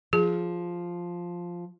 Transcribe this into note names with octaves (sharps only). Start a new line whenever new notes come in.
F3 G#4